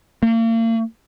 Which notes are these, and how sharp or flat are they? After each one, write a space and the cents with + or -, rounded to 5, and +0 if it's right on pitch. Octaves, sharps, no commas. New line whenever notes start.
A#3 -40